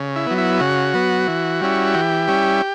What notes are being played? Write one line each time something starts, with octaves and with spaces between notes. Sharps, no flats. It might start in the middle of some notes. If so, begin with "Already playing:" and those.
Already playing: C#3
E4
F#3 B3
E4
C#3 F#4
F#3 B3
E3
G3 C#4 E4
E3 G4
G3 C#4 E4